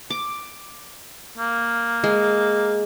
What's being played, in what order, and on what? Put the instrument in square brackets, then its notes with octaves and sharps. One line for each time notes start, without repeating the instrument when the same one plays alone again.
[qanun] D6
[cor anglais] A#3
[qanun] G#3